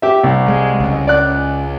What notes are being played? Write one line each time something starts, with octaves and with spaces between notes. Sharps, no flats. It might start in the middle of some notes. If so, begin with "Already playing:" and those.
G4 E5
C2
G#3
C#2
D5 F#6